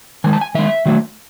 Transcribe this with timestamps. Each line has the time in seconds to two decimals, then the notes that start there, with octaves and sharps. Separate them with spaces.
0.24 D#3 G#3 G#5
0.33 A5
0.41 G#5
0.55 D#3 G#3 E5
0.86 D#3 F#3 A3